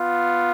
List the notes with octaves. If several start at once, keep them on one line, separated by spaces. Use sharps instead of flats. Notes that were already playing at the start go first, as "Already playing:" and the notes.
Already playing: B3 F4